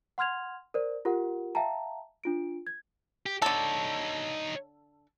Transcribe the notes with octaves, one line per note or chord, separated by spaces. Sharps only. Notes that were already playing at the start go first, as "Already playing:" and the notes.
F#5 C6 F6 G#6 F7
A#4 C5 D5
F4 G4 A#4 F#5
E5 F5 G5 A5 A#5
D4 F4 D7
G#6
G4
D3 D#4 A4 C#5